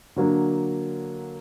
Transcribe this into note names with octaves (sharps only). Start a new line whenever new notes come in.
D3 F#3 A#3 D4